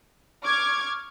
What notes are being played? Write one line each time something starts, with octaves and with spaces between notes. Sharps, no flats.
C#6 D6 F6 G#6